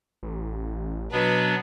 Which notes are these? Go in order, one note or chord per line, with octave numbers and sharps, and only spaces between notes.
A1
B2 F#3 B3 D4 B4